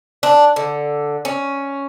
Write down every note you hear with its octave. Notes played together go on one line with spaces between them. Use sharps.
D4
D3
C#4